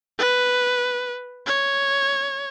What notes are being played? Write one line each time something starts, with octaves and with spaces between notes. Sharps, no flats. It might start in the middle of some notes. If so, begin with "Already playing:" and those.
B4
C#5